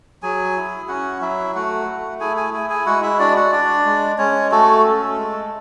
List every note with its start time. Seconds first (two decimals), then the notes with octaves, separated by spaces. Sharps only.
0.23 F#3 G#4 G#5
0.56 E4
0.88 C#4 F#4 F#5
1.21 F#3 E4 E5
1.55 A3 F#4 F#5
1.87 A3
2.20 E4 G#4 G#5
2.37 G#4 G#5
2.53 E4 G#4 G#5
2.70 G#4 G#5
2.86 G#3 F#4 F#5
3.03 E4 E5
3.19 D4 F#4 D5
3.36 F#4 F#5
3.52 D4 D5
3.86 G#3
4.18 G#3 C#4 C#5
4.51 A3 F#4 A4
4.84 C#4
5.17 G#3